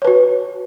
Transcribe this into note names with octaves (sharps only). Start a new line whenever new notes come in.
F#4 B4 C#5